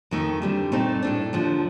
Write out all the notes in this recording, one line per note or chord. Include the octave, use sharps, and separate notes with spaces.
F2 D#3 A3
D3 G3 C4
A#2 A3 C4 D#4
A2 A3 D4
D#2 D3 F3